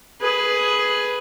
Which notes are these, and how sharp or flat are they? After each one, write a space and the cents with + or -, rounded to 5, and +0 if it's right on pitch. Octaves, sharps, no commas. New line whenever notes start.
G#4 +5 B4 +0